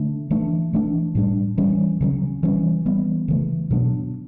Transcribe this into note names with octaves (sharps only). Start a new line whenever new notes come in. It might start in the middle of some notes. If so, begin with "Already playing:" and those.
Already playing: D3 A3 D4
E3 A3 D4
E3 A3 D4
A2 G3 D4
E3 G3 C#4
C#3 F#3 C#4
E3 G3 C#4
E3 G3 B3
C#3 E3 A3
B2 F#3 B3 D4